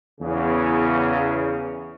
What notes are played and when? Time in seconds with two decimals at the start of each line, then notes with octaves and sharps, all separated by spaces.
0.21 E2 C#3